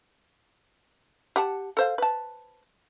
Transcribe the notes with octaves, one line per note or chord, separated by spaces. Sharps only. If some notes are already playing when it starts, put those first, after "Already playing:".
G4 F#5 A5
A4 C5 F5
B4 A5